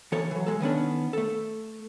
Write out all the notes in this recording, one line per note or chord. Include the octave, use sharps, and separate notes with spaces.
E3 A4 C#5
E3 F#3
G#3 A4
D#3 B3 C#4 D4
A3 A4